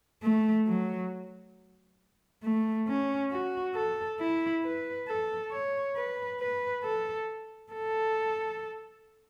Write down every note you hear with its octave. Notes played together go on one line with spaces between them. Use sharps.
A3
F#3
A3
C#4
F#4
A4
E4
B4
A4
C#5
B4
B4
A4
A4